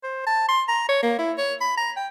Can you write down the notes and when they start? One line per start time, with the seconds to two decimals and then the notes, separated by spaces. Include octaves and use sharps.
0.04 C5
0.27 A5
0.49 C6
0.68 A#5
0.89 C#5
1.02 A#3
1.19 E4
1.38 C#5
1.61 B5
1.78 A#5
1.97 G5